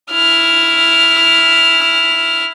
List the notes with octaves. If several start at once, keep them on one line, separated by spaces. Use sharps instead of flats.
E4 F6